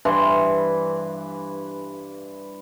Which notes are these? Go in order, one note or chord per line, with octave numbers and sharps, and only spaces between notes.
G2 E3 C6